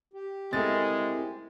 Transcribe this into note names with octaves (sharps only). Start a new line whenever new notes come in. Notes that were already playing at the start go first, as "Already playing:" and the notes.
G4
G#3 A3 C4 E4 A#4 A6